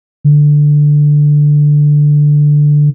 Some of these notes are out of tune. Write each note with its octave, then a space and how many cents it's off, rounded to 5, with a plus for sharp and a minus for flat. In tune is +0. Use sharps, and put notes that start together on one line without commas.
D3 +5